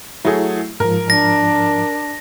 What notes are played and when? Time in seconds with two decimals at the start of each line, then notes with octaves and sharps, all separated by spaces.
0.25 F#3 A3 E4 G#4
0.80 G#2 F3 A#4
1.10 D4 A#6